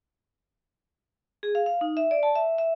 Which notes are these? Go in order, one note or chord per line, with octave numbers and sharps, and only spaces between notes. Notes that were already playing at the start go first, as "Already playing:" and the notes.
G#4
F5
F5
D#4
E5
D5
A5
E5
E5